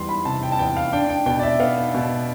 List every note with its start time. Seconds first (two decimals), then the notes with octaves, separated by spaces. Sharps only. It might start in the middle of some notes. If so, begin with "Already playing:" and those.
Already playing: E2 G3 C6
0.09 B5
0.25 C3 A5
0.43 G5
0.52 A5
0.59 E2 G5
0.77 F5
0.93 D4 G5
1.10 G5
1.26 B2 G5
1.39 D5
1.43 E5
1.60 B3 F5
1.94 B2